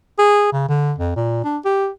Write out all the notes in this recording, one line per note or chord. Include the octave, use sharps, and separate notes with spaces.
G#4
C#3
D3
F2
A#2
D4
G4